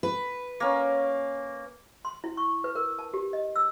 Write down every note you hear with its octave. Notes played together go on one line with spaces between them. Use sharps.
B4
A#3 C#4
C6
E4
C#6
B4
A#4
A5
G4
D#5
E6